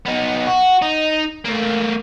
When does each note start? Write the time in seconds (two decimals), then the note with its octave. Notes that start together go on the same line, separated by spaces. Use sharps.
0.06 B3 D#4
0.47 F#4
0.82 D#4
1.45 A3 A#3